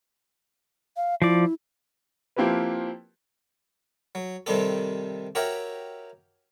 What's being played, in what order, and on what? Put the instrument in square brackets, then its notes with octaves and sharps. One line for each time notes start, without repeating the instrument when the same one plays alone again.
[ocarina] F5
[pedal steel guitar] F3 D5 [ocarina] E4
[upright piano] F3 A#3 C4 E4 G4 B4
[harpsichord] F#3
C3 D#3 G3 C4 G4 A4
F#4 G4 A#4 C#5 E5 G5